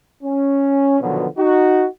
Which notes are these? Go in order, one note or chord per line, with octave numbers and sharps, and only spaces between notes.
C#4
B2 D3 D#3 F3 F#3 B3
D#4 F#4